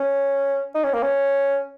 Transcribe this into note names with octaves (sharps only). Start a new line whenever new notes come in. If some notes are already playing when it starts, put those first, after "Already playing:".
Already playing: C#4
D#4
C#4
A#3
C#4